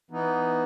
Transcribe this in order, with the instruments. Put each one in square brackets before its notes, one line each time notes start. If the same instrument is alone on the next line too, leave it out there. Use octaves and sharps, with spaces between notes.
[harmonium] E3 B3 D#4